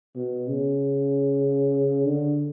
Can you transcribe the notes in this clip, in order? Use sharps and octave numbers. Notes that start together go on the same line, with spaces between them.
B2
C#3
D3